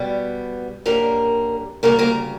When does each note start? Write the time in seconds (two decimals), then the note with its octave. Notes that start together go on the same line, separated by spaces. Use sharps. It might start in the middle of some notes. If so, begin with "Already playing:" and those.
Already playing: B2 G3 B3
0.86 F#2 D3 G3 A#3 A#4
1.83 D2 C#3 G3 A#3 A#4
1.99 A#3 A#4